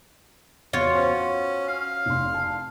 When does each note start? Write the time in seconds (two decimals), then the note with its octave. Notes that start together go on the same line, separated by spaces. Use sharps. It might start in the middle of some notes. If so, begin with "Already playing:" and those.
0.73 E2 F4 F#4 C#5
0.95 C#4 C5
1.68 F5
2.06 F1 C6
2.34 A5